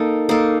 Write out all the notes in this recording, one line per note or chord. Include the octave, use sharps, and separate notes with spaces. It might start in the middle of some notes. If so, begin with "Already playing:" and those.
Already playing: A#3 D#4 A4
A#3 D#4 A4